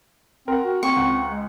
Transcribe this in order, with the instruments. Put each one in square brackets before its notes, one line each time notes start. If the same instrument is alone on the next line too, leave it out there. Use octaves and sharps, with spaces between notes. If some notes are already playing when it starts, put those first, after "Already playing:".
[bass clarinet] C4 [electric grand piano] A#4 F#5
[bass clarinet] F#4
[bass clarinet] C4 [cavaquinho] C#6
[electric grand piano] C#2 F#5
[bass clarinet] G#3